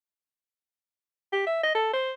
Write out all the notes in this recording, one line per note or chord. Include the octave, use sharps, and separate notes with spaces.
G4
E5
D#5
A4
C5